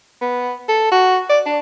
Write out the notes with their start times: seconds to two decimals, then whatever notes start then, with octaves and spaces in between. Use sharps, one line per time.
0.21 B3
0.69 A4
0.91 F#4
1.29 D5
1.46 D4